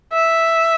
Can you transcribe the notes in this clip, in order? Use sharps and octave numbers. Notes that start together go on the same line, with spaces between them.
E5